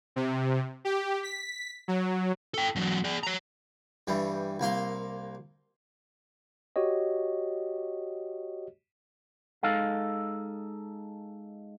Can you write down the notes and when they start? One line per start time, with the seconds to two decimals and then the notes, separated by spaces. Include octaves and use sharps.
0.16 C3
0.85 G4
1.23 B6
1.88 F#3
2.54 A4 G5
2.76 E2 F#3
3.04 G#4 D5
3.23 C#5 A#5
4.07 G2 E3 G3
4.60 C2 A#3 F5 C6
6.76 F#4 G4 C#5 D#5
9.63 G#3 D#4 A4 F5